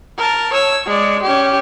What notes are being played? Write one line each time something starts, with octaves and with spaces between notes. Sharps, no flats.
A#4 A5
C#5 E6
G#3 D5
C#4 G4